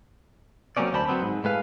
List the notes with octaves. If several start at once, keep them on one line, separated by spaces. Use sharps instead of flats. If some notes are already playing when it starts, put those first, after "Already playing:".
F#3 A#3 C4 C#4 D5
D2 C5 A5 B5
F#3 B3 C4
G#2
A2 G#3 B4 F5